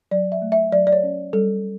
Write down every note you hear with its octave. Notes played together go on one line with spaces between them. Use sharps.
F#3 D5
E5
A3
E5
F#3 D5
D5
C#5
C#4
G3 A4